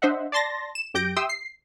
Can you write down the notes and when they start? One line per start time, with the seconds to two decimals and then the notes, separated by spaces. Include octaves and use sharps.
0.02 D4 C5 D#5 E5 F#5
0.32 D5 A5 C6 A6 A#6
0.75 E7
0.94 F#2 G4 G6 A#6 D7
1.16 G4 E5 G5 C6 D#6 E6
1.29 C7